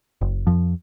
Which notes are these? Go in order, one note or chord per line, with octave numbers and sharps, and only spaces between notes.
F#1
F2 F3